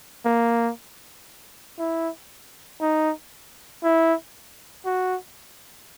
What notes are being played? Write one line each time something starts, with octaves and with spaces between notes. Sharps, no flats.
A#3
E4
D#4
E4
F#4